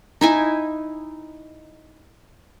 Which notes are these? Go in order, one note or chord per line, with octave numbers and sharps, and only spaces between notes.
D#4 E4 G#5